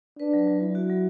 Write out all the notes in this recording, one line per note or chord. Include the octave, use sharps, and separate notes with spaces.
D4 B4
F#3
F#3
F#3 E4
F#4
F#3